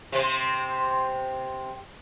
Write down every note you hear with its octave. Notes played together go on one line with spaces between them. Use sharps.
C3 C4